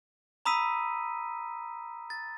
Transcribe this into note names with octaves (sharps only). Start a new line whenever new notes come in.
A#5 B5 D#6 E6 B6 D#7
A6